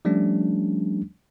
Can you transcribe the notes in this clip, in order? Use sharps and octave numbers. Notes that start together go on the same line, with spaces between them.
F3 G3 A3 C#4 D4